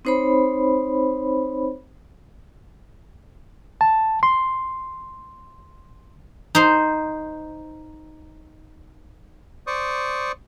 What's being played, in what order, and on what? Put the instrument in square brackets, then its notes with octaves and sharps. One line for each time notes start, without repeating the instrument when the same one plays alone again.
[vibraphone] C4 D#4 C5 C#5 B5
[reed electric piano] A5
C6
[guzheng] D#4 C5
[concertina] C5 D5 C#6 D#6